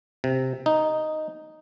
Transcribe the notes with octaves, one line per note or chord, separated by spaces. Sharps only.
C3
D#4